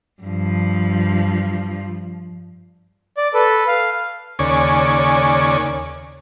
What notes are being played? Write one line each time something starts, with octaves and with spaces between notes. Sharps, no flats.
G2 F3
D5
A4 B4
F5
D#2 C#3 C#5 D5 G#5